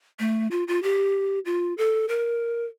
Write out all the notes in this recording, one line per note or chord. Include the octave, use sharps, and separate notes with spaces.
A3
F4
F4
G4
F4
A4
A#4